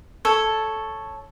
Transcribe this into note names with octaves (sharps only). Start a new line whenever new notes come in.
A4 C#5